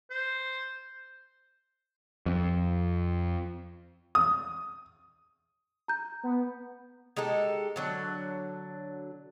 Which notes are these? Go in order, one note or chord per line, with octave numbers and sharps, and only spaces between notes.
C5
F2
D#6
A#5 G6
B3
G#3 D#4 G4 A4
D3 F#3 D4